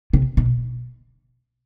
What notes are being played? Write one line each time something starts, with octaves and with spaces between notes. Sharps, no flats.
C3
B2